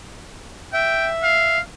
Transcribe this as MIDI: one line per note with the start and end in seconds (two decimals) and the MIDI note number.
0.73 1.58 76
0.73 1.10 79
1.23 1.60 77